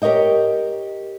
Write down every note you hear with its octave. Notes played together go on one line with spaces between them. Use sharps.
G4 A#4 C#5 D#5 G5